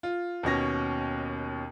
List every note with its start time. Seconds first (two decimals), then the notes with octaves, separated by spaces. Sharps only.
0.03 F4
0.43 D#2 B2 C#4 A#6